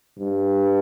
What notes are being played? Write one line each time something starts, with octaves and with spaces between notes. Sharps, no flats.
G2